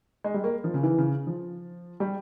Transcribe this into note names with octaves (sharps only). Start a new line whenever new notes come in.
G#3
G3
A#3
F3
C#3
E3
C#3
F3
G3